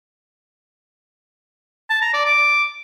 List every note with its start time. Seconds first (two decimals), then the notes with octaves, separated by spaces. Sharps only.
1.90 A5
2.02 A#5
2.14 D5
2.26 D6